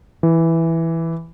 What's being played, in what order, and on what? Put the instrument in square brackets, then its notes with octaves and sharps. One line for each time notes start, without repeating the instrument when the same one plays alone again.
[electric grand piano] E3